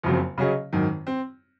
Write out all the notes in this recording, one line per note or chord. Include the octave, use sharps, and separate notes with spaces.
F#1 F2 C#3 F#3 C4
C#3 F#3 C#4 G#4 D#5
G#1 F#2 D#3
C4